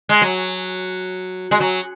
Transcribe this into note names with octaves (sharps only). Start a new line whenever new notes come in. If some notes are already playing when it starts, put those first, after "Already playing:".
G#3
F#3
G#3
F#3